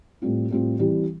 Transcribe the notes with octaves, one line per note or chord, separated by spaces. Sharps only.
A2 G3 C4 F4
A2 G3 C4 F4
E3 G3 C4 E4 G4